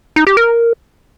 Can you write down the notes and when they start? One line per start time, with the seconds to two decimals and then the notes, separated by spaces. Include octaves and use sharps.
0.16 D#4
0.27 G4
0.37 A#4